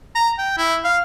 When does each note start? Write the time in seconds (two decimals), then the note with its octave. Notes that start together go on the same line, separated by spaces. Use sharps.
0.15 A#5
0.38 G5
0.58 E4
0.84 F5